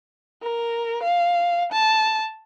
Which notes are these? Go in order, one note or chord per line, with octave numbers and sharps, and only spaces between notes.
A#4
F5
A5